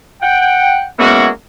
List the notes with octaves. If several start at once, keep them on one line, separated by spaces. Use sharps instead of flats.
F#5 G5
G#3 A#3 B3 C#4 E4 F#4